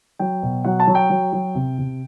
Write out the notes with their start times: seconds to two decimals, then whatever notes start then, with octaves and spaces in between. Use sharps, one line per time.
0.19 F#3 G5
0.43 B2
0.65 F#3 F#5
0.80 A5
0.87 F#3
0.95 G5
1.10 F#3
1.33 F#3
1.55 C3
1.78 C3